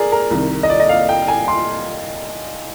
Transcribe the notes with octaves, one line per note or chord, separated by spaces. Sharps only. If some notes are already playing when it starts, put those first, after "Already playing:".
Already playing: G#4 A#4 D5
A#4
C2 C3 D#3
D#5
D5
D#5
F5
G5
G#5
C6